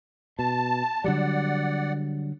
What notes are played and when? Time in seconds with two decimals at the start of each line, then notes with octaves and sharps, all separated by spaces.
0.39 B2 A5
1.04 D3 F#3 G3 D5 F#5